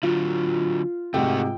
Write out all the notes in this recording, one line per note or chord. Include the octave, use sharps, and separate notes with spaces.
D3 F#3 F4
G#2 C3 A3 F#4 G5